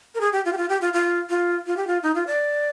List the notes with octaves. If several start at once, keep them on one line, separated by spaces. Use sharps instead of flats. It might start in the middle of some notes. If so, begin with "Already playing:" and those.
A#4
G#4
G4
F4
G4
F4
G4
F4
F4
F4
F4
G4
F4
D#4
F4
D5